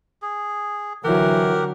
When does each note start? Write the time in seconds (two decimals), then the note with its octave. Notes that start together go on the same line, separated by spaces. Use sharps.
0.22 G#4
1.04 D3 E3 F#3 G4 A#4 F#5